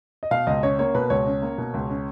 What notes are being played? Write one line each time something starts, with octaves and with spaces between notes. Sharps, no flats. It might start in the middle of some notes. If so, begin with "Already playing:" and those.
D#5
B2 F5
C#2 D#5
C#4 C#5
A#3 C#5
B2 B4
C#2 C#5
C#4
A#3
B2
C#2
C#4